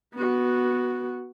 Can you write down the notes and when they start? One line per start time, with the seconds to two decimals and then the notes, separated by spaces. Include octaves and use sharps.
0.14 B3 F#4